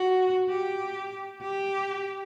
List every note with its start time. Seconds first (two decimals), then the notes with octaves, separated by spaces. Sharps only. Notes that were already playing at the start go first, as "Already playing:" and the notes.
Already playing: F#4
0.49 G4
1.42 G4